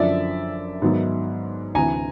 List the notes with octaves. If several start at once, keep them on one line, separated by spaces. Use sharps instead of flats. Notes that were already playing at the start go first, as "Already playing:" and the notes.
Already playing: F#2 D3 F3 D5 E5
G#2 D#3 F#3 B3
D2 C3 E3 G#5 A#5